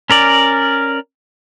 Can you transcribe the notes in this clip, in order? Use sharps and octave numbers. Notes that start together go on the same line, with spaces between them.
C#4 A#4 D5